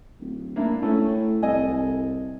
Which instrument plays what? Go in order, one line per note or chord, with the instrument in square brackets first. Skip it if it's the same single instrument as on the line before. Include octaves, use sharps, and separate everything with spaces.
[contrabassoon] D1
[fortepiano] A#3 D4 E4
[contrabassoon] A2 [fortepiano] A3 C#4
[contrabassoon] C2 [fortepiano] A4 D#5 G#5